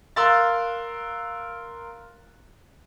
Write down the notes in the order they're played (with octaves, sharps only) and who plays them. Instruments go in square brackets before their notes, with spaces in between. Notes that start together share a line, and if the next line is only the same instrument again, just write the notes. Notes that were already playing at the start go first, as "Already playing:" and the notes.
[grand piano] A#4 F5 C6 E6 F#6 A6